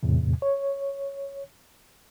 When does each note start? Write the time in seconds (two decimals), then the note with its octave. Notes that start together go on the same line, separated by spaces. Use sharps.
0.03 E2 A2 C3
0.42 C#5